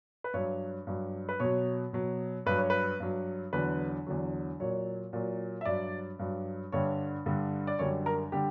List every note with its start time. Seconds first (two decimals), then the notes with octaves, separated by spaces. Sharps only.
0.24 B4
0.34 G2 F#3 C#5
0.87 G2 F#3
1.29 B4
1.40 B2 F#3 C#5
1.93 B2 F#3
2.46 G2 F#3 B4
2.58 C#5
2.70 B4
3.00 G2 F#3
3.53 E2 D3 F#3 B4
4.06 E2 D3 F#3
4.60 A#2 F#3 C#5
5.13 A#2 F#3
5.61 E5
5.65 G2 F#3 D5
6.19 G2 F#3
6.72 G2 D3 G3 C#5
7.26 G2 D3 G3
7.67 D5
7.79 F#2 D3 G3 C#5
8.06 A#4
8.32 D3 G3 G4